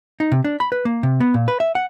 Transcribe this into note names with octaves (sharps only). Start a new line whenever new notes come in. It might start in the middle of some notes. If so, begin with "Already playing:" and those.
D#4
C3
D4
B5
B4
A#3
C3
B3
A#2
B4
E5
F#5